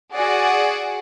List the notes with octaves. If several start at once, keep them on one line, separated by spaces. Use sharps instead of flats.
F#4 G#4 D5 F#5 G#5